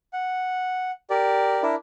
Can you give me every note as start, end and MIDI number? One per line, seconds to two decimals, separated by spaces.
0.13 0.91 78
1.10 1.62 67
1.10 1.62 70
1.10 1.62 74
1.63 1.75 62
1.63 1.75 64
1.63 1.75 70